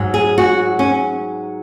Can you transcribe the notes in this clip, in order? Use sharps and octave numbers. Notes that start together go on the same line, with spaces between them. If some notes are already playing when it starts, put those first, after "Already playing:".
Already playing: G#2 F#3
G#4
F#4
C#4